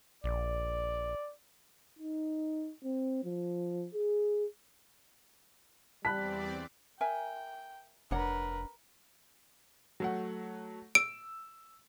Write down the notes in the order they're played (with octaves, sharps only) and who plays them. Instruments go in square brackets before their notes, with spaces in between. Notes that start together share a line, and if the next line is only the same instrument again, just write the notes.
[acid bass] A#1 [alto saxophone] D5
[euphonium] D#4
C4
F3
G#4
[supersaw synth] E2 C4 D5 [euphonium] G3 [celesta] A5 B5 [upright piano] F#6 B6
[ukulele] A#4 E5 G#5 [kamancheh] G5
[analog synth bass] F1 [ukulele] D4 C#5 F#5 [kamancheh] A#4 B4
[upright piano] F#3 A3 F#5
[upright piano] E6 [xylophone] D7